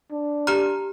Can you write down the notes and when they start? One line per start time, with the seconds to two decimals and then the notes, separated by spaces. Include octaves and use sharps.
0.12 D4
0.47 G4 A#5 F6